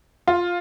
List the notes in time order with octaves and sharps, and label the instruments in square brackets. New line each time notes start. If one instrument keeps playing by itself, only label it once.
[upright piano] F4